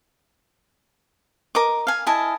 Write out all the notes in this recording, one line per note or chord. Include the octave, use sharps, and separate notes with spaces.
A#4 D#5 D6
F5 G#5
E4 D#5 G#5 A5